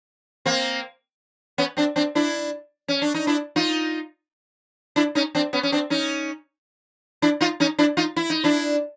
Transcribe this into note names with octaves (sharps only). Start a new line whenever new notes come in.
A#3 C4
B3 C#4
C4 D4
C4 D4
D4 E4
C#4
D4
D#4
D4 E4
D#4 F4
D4 E4
C#4 D#4
C4 D4
B3 C#4
C#4
C4 D4
C#4 D#4
D4 E4
D#4 F4
C#4 D#4
D4 E4
D#4 F4
E4
D#4
D4 E4